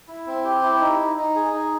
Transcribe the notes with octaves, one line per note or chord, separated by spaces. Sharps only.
E4
C4
G4
E4
D#4
D#4
D#4
G#4
D#4